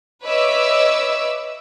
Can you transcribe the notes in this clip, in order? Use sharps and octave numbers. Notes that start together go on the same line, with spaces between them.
B4 C#5 D#5 E5 D6 E6